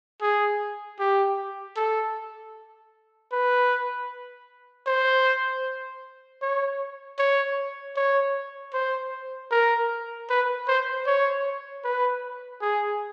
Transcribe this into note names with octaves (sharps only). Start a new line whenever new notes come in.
G#4
G4
A4
B4
C5
C#5
C#5
C#5
C5
A#4
B4
C5
C#5
B4
G#4